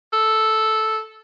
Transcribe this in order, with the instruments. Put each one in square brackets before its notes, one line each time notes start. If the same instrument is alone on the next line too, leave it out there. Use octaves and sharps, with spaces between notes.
[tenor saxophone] A4